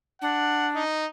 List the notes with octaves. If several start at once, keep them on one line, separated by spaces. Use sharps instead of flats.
D4 F#5
D#4